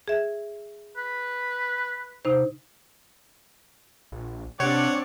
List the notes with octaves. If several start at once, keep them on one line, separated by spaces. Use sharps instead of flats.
G#4 E5
B4
C3 D#4 C5
A#1
C3 C4 D4 C#5 D5 F#5